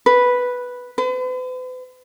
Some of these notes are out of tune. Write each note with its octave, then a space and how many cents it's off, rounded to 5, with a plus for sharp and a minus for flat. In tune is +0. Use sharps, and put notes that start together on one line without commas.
B4 -5
B4 +45